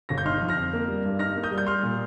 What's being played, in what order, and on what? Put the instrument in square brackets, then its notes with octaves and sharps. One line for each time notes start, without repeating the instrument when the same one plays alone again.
[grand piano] G1 A#6
G6
D#4 C6 F6
F3
F6 A#6
F2
A#3
G3
G2
D#4 F6 A#6
A#3
D#6 G6
G3
G6
G3 C6 F6
A#2